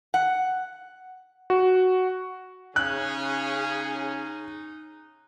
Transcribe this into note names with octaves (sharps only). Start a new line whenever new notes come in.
F#5
F#4
C#3 C#4 D#4 G#4 F#6